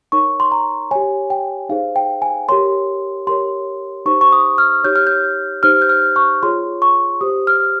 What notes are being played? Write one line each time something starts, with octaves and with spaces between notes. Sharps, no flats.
D#4 A#4 C#5 C#6
C6
A#5
G4 C#5 G#5
G5
D#4 G#4 C5 F5
G5
G#5
G4 A#4 C#5 C6
G4 A#4 C#5 C6
D#4 G4 C5 C#6
C#6
D#6
F6
D#4 G4 C#5 G6
F6
G6
D#4 G4 C5 F6
G6
F6
C#6
F4 G#4 C#5 C6
C#6
G4 C5 D#6
F6